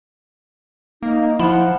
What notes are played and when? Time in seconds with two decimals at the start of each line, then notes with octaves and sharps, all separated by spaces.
1.03 A#3 D#4
1.39 F3 E4 F#5